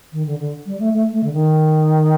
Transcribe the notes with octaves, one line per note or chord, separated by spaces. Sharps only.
D#3
D3
D3
G3
A3
A3
A3
D3
D#3